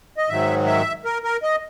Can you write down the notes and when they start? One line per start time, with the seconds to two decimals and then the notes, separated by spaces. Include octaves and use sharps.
0.17 D#5
0.29 G#2 D#3 F#3 E5
0.66 E5
1.05 A#4
1.24 A#4
1.43 D#5